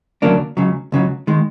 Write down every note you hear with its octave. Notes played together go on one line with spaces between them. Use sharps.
D2 C#3 F#3 A#3 D4
C#2 C#3 F#3
C#2 C#3 F#3
D#3 G#3